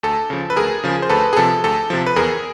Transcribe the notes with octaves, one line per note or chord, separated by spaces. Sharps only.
D2 A4
C#3 F3
B4
D2 G#4 A#4
C#3 F3
C5
D2 A4 B4
G#4
C3 F3 A4
D2 A4
C3 F3
B4
E2 G#4 A#4